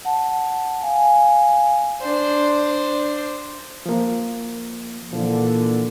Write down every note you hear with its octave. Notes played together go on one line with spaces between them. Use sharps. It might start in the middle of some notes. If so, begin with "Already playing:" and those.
F#5 A5
F5 G#5
D4 C5
F3 A#3
A#2 D3 E3 F3